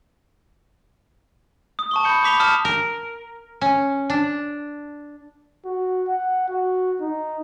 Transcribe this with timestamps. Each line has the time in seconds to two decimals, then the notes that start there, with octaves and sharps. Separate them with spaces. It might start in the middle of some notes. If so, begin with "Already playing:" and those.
1.79 D#6
1.91 A5 C#6 G7
2.04 B5 G6 C#7 G7
2.24 B5 D6 B6 F7 G7
2.40 A5 D#6 F6
2.65 A#4
3.61 C#4
4.10 D4
5.65 F#4
6.08 F#5
6.49 F#4
7.01 D#4